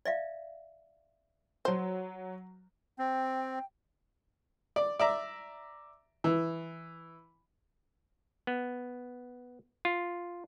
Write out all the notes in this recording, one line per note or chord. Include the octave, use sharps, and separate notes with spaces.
D5 E5 F5
F#3 F#4 C5
C4 G5
D5
D5 E5 A#5
E3
B3
F4